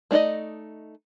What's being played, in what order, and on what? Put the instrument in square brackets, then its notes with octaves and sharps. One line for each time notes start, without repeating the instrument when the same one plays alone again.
[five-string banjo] A3 D4 D#4 D5 D#5